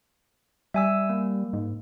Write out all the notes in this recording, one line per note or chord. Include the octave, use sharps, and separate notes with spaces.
G3 E5 G#5 E6
A#3
G#2